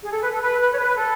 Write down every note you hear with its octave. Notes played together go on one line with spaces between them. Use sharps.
G#4
A4
B4
A4
B4
B4
C#5
B4
A4